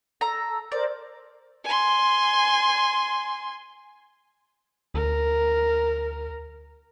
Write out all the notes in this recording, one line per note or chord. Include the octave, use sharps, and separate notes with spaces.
A4 A#5 E6
A#4 C5 D5
G#5 C6
D2 A#4